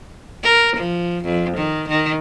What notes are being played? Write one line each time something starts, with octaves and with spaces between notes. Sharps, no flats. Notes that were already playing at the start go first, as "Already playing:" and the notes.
A#4
F3
F2
D#3
D#3